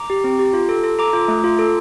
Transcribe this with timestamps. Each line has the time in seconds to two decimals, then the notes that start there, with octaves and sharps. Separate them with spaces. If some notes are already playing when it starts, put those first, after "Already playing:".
Already playing: A#5 D6
0.10 G4
0.24 C4
0.39 G4
0.53 F4
0.69 A4
0.84 A4
0.99 A4 A#5 D6
1.13 F4
1.28 A3
1.44 F4
1.59 A4